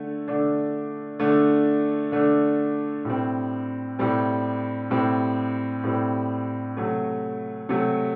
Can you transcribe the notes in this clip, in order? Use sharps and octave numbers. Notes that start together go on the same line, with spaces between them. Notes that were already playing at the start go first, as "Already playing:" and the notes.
Already playing: D3 A3
D3 A3 D4
D3 A3 D4
D3 A3 D4
A2 G3 C4
A2 G3 C4
A2 G3 C4
A2 G3 C4
C3 F#3 A3
C3 F#3 A3